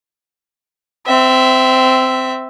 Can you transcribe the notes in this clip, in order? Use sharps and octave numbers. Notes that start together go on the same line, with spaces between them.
C4 E5